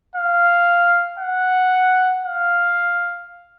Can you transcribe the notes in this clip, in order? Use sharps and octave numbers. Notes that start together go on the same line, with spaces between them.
F5
F#5
F5